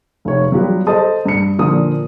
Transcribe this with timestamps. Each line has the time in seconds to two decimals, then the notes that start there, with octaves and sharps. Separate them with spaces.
0.25 F1 C#5
0.52 F#3 G3 B3 F4 G4 B4
0.87 A4 C5 D#5 A5 D#6
1.25 G2 C#7
1.58 A#2 D3 F3 A#4 D#6